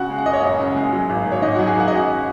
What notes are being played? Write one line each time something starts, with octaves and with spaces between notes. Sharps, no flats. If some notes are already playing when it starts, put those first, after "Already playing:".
Already playing: C#3 F#4 F#5
G#3
F#5
F#1 D#5
C#5
F#2 D#5
C#3
G#3
F#3
G#1
G#1
C#5
G#2 D#5
F#3 F#4 F#5
G#4 G#5
G#1 F#5
D#5
C#4 F#4 F#5